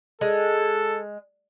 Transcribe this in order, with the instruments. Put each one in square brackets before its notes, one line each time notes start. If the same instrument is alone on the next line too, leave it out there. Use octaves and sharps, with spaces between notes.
[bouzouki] G#3 [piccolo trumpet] A4